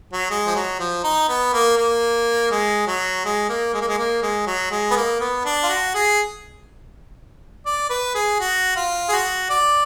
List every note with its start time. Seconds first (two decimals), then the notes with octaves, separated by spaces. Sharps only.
0.13 F#3
0.30 G#3
0.46 F3
0.55 F#3
0.79 F3
1.04 D#4
1.29 B3
1.53 A#3
1.77 A#3
2.51 G#3
2.87 F#3
3.25 G#3
3.49 A#3
3.73 G#3
3.81 A#3
3.88 G#3
3.98 A#3
4.22 G#3
4.47 F#3
4.71 G#3
4.91 B3
4.96 A#3
5.20 B3
5.45 D4
5.63 F4
5.69 F#4
5.94 G#4
7.66 D5
7.90 B4
8.15 G#4
8.40 F#4
8.76 F4
9.09 G#4
9.13 F#4
9.50 D5